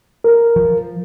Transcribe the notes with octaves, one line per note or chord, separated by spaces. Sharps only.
A#4
F3